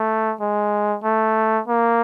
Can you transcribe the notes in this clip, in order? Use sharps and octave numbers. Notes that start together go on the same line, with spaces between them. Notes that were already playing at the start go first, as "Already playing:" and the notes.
Already playing: A3
G#3
A3
A#3